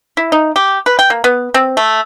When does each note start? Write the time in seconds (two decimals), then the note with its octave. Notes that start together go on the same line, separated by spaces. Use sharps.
0.17 E4
0.32 D#4
0.56 G4
0.86 B4
0.99 G5
1.10 A#3
1.24 B3
1.54 C4
1.77 A3